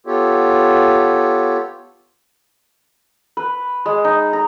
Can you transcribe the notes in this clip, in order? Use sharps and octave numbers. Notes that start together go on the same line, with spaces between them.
B3 F4 G4 A4 C#5
B4
G#3
D#4
A#5